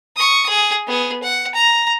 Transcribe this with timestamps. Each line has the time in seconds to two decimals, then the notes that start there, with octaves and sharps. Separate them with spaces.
0.16 C#6 D#6
0.49 G#4
0.87 B3 G#4
1.23 F#5
1.55 A#5